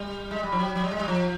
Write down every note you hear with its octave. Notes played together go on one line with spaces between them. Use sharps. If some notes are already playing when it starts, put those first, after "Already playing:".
Already playing: G3
G#3
G3
F3
F#3
F#3
G3
G#3
G3
F3